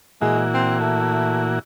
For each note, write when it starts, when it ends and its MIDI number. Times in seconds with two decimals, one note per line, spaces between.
0.21 1.59 46
0.21 1.59 52
0.21 0.43 56
0.21 1.59 66
0.54 0.75 60
0.80 1.53 57